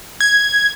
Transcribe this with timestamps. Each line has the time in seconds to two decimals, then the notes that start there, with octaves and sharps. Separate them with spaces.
0.20 G#6